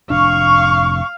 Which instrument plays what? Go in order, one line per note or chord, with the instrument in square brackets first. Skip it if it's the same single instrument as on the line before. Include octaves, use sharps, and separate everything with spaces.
[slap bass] F1 A2 D4 [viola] F5 [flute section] C#6